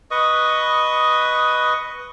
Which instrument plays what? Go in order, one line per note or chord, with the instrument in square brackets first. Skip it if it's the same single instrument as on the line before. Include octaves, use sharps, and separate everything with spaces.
[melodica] B4 D#5 C#6 D#6